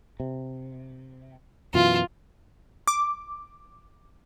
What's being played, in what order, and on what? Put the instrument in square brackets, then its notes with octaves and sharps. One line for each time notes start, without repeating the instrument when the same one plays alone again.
[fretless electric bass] C3
[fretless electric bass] F#2 B2 E3 [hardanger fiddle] F4
[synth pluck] D6